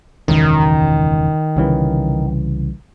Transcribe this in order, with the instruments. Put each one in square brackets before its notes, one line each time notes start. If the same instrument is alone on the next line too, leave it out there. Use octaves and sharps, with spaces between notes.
[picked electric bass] E1 C#2 F#2 [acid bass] D#3
[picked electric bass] C2 C#3 E3